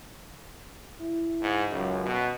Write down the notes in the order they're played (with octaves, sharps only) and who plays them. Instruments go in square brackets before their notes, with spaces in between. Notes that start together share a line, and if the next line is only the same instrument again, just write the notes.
[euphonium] E4
[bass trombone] G#2
[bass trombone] C#2 [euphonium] F#2
[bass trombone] B2